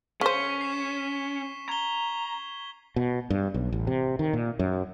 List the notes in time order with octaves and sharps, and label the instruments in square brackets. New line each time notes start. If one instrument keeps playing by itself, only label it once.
[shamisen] C#3 C5 [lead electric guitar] C#4 [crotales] C#6 B6 G7
[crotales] C7 E7
[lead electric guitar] A#5 [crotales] G#6 G7
[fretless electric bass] B2
G2
B1
A1
C3
D#3
A#2
F#2